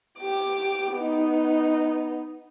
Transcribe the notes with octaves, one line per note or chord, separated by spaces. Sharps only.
G4 D6
B3 D#4